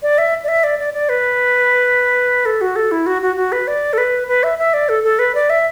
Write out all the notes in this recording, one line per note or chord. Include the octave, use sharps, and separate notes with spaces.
D5
E5
D5
E5
D5
D5
D5
B4
A4
F#4
A4
E4
F#4
F#4
F#4
B4
D5
A4
B4
B4
E5
E5
D5
A4
A4
B4
D5
E5